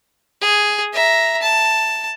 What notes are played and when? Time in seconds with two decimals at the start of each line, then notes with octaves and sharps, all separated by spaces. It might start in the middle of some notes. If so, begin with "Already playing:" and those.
0.41 G#4
0.93 E5 A#5
1.42 A5